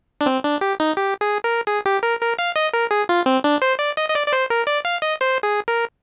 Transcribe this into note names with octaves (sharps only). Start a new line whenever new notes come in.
D4
C4
D4
G4
D#4
G4
G#4
A#4
G#4
G4
A#4
A#4
F5
D#5
A#4
G#4
F4
C4
D4
C5
D5
D#5
D#5
D5
D5
C5
A#4
D5
F5
D#5
C5
G#4
A#4